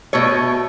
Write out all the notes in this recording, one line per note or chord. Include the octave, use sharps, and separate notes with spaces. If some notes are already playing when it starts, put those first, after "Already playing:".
B2 A3 C#5